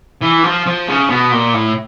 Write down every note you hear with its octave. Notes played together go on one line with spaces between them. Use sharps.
E3
F3
F3
C#3
B2
A#2
A2